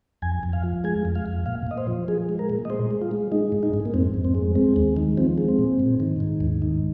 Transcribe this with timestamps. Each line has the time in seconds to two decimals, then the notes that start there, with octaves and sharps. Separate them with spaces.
0.22 F2 G#5
0.43 F2
0.53 F5
0.64 F3
0.84 G#3 G#5
1.05 F2
1.15 F5
1.26 F2
1.46 A#2 F5
1.67 A#2 D#5
1.77 C5
1.87 F3
2.08 F3 G#4
2.29 G#3
2.39 A#4
2.50 A#2
2.65 D#5
2.70 G#3 C5
2.91 G#3
3.01 F4
3.11 G#3
3.32 G#3 D#4
3.52 G#2
3.63 D#4
3.74 G#2
3.85 A#3
3.94 F2 C4
4.14 F2
4.24 C4
4.35 G#3
4.55 G#3 C4
4.76 D#2
4.97 D#3
5.17 F3 C4
5.38 G#3
5.48 C4
5.59 A#2
5.79 G#2
6.00 D#3
6.20 G#2
6.41 D#2
6.62 D#3